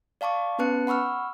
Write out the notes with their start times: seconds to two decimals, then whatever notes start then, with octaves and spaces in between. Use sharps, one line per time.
0.21 D5 F5 A5 C#6 D6
0.59 B3 C#4 B4 A5 F#6 C#7
0.87 F#5 B5 C#6 E6 F6